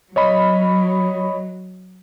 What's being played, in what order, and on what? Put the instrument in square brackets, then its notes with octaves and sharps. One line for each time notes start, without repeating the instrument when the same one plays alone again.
[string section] F#3 [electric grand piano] C#5 D#5 B5